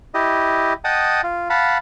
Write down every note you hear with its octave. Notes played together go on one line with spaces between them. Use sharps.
E4 G4 D#5
D#5 F#5 G5 A5 D#6
F4
F5 F#5 A5 B5